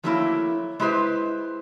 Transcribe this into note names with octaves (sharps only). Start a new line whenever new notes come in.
F3 F#3 A3 A#3 D#4 E4
G#3 E4 G4 B4 C5